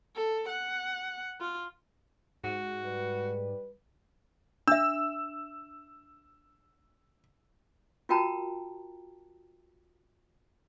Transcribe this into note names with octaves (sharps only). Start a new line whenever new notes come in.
A4
F#5
F4
G#2 F#4
G3 B4
D4 E5 E6
F4 F#4 A#4 G5 A5 A#5